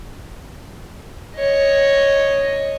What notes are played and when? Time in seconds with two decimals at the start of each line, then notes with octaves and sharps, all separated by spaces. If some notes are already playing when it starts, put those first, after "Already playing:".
1.37 C#5 D#5